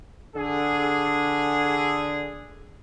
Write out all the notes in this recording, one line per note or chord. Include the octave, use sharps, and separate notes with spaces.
D3 G#4